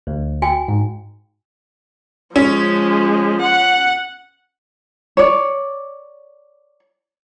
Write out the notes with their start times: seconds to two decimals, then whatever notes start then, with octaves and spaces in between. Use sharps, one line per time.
0.07 D2
0.42 F#4 G5 G#5
0.68 G#2
2.36 F3 G#3 C#4
3.41 F#5
5.17 C#5 D5